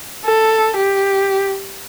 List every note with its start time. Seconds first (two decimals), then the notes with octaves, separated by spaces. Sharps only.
0.25 A4
0.77 G4